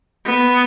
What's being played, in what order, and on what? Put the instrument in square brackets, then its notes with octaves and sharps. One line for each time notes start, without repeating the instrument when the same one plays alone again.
[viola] B3